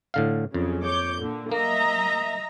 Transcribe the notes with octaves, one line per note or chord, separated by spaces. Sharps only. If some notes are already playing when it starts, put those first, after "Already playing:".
A2 D3 F5
F2 C#3 F#3
C#5 D6 G6
A#2 D3
A#3 D#5 E5 A#5